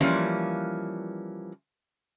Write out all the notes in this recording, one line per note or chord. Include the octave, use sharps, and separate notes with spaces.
E3 F3 G3 A#3 C#4